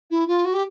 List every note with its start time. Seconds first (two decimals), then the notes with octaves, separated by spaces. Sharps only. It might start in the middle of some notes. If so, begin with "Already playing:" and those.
0.10 E4
0.27 F4
0.45 F#4
0.53 G4